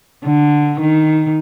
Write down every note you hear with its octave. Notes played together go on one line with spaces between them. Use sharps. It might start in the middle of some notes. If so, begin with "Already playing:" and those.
D3
D#3